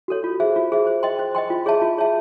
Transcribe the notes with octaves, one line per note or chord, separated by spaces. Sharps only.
F#4 A4 C#5
F4
G#4 C5 E5
F4
G#4 C5 E5
C5
D#5 G5 C6
C5
D#5 G5 C6
F4
G#4 C#5 E5 A5
F4
G#4 C#5 E5 A5